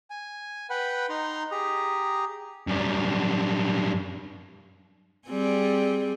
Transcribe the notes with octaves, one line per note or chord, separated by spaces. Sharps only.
G#5
B4 F#5 G5 B5
D#4 A#5 C6
G4 G#4 A#5
F#2 G3
G3 C4 G#4